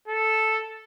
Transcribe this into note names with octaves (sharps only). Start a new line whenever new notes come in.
A4